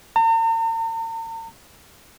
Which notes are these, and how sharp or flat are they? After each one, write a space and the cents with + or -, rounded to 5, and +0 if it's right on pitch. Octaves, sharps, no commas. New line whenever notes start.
A#5 -45